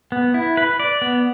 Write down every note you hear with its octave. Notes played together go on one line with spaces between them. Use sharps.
B3
E4
B4
D5
B3